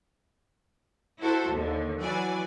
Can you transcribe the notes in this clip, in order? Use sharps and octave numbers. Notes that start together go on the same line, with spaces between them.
E4 F#4 A4 C5
D#2 D3
E3 F#3 F#4 D5 G#5